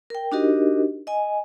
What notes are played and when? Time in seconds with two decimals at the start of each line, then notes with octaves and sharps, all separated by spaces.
0.10 A#4 G5
0.32 D4 D#4 F#4 G4 A#4 D#5
1.07 D#5 G#5